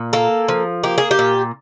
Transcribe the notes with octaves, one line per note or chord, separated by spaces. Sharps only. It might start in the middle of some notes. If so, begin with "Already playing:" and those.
Already playing: A#2
A#3 A4
F3
A#3 G4
G#4
G4
A#2